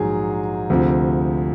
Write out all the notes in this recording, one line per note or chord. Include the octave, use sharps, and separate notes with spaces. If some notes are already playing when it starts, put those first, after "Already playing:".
Already playing: A#1 G#2 D#3 F#3 G#4
D2 C3 F3